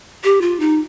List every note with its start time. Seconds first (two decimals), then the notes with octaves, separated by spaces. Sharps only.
0.24 G4
0.41 F4
0.60 D#4